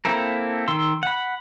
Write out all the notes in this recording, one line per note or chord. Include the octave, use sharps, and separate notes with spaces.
A#3 C4 E4 A4 A#4
D#3 C6 E6
F#5 B5